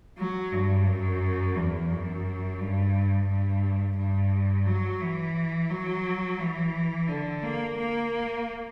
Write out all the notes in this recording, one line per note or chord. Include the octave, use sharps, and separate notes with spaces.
F#3
G2
F#2
E2
F#2
G2
G2
G2
F#3
E3
F#3
E3
D3
A#3
A#3